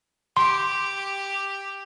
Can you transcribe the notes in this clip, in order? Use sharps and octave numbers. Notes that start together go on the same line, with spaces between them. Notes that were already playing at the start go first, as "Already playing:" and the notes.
G4 C6